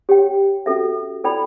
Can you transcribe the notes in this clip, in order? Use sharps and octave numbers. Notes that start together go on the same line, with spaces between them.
G4 C#5 G5
C#4 F#4 A4 E5
E4 A4 D5 G5 B5